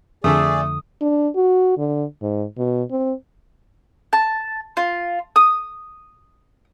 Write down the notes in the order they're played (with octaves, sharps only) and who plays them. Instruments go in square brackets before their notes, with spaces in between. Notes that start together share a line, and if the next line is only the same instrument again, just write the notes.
[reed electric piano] F2 D3 [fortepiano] A3 A4 E5 [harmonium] G#4 D5 [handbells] D#6
[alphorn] D4
F#4
D3
G#2
B2
C4
[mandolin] A5
F4
D#6